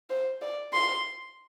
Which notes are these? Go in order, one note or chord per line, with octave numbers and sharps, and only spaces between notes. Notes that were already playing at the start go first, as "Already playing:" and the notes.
C5
D5
C6